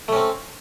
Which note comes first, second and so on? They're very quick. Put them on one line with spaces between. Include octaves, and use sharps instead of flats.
A3 C#4 C4